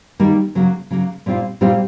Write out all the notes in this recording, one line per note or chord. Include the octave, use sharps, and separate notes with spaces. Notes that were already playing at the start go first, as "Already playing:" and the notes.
D#3 G3 A#3
C#3 F#3 A#3
C#3 F#3 A#3
A#2 G3 C4 F4
A#2 G3 C4 F4